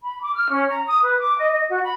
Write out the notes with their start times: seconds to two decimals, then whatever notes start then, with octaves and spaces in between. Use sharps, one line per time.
0.01 B5
0.21 D6
0.35 F6
0.50 C#4
0.68 A#5
0.85 D#6
1.03 B4
1.19 D6
1.37 D#5
1.50 D#5
1.68 F#4
1.83 B5